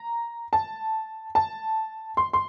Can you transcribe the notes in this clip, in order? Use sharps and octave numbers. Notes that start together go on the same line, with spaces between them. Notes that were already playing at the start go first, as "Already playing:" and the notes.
Already playing: A#5
A5
A5
C6
C6